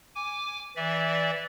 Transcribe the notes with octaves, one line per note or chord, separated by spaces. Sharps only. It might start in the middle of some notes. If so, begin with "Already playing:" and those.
G#5 D6
E3 D5 E5